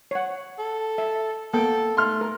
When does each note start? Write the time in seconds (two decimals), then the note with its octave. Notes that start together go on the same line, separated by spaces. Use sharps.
0.11 C#5 F#5
0.59 A4
0.98 E5
1.54 A#3 B3 A4 G5
1.97 A3 C6 F6
2.21 A#4